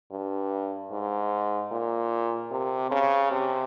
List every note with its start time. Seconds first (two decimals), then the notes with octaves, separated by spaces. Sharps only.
0.11 G2
0.92 G#2
1.72 A#2
2.51 C3
2.91 C#3
3.31 C3